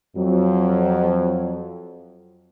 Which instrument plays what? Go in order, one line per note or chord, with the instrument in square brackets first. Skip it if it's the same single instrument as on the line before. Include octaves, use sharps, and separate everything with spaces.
[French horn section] F2 F#3